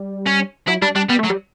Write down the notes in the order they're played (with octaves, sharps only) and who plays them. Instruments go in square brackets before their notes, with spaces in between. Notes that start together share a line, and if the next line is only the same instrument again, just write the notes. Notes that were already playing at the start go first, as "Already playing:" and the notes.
Already playing: [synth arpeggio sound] G3
[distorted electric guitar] C#4
[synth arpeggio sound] F#3 [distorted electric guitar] E4
[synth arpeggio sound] G3 [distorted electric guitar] D4
[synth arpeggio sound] G3 [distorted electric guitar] D4
[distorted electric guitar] G3 [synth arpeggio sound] B3
[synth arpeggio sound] A3
[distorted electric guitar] F#3
[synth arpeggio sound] G3